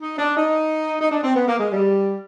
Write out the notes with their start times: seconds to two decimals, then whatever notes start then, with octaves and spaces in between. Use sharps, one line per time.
0.01 D#4
0.18 D4
0.37 D#4
1.00 D#4
1.11 D4
1.23 C4
1.35 B3
1.47 A#3
1.59 G#3
1.72 G3